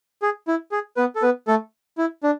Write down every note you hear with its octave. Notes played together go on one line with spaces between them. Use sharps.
G#4
E4
G#4
B3 B4
A4
B3 B4
A3 A4
E4
D4